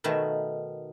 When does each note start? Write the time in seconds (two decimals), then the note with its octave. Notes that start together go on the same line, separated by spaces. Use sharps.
0.04 B2 D#3 A3 B4 A5